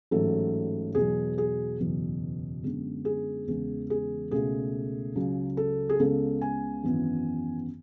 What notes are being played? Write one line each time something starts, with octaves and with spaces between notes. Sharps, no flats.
A1 G#2 F#3 A3 A4
E2 B2 F#3 G#4
G#4
F#1 E2 B2 F#3
F#2 D3 G#3 B3
G#4
E2 C#3 E3 G#3 B3
G#4
C#2 B2 A3 G#4
C#2 C#3 F#3
A4
G#4
C#2 C#3 G#3 B3 A4
G#5
G#1 F#2 E3 B3